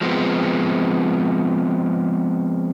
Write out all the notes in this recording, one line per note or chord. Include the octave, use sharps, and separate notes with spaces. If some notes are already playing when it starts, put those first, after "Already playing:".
F3 G#3 B3 C4